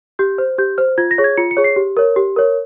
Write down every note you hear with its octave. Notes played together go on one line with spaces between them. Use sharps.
G4 G6
C5
G4 G6
C5 F6
F4 G#6
A#6
G#4 C#5
G#6
F4 C#7
C#7
G#4 C#5
C7
G4
A#4 C#5
G4
A#4 C#5